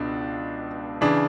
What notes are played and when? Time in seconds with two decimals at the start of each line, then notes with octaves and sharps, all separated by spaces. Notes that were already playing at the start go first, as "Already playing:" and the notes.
Already playing: C#2 B2 D4
1.01 C#3 E3 D4